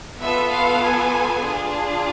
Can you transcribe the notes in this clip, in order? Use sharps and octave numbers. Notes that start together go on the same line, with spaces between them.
B3 F4 A4 E5
F5
G#5
D4 F4 G#4